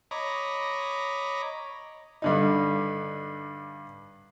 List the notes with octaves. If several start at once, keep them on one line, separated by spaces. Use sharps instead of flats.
C#5 D#5 A#5 B5 D6
G2 D3 D#4